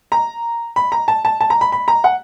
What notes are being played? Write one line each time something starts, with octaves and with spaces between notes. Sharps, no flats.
A#5
B5
A#5
A5
A5
A5
A#5
B5
B5
A#5
F#5